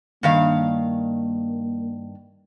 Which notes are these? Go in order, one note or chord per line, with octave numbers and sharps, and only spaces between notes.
G2 D#3 A#3 F5